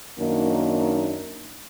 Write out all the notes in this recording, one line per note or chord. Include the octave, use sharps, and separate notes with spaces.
F#2 D#3 F#3 A#3 D4 D#4